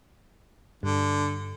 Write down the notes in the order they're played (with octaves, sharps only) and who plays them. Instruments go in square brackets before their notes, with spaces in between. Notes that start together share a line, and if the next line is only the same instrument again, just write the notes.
[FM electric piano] G2 [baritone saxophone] D3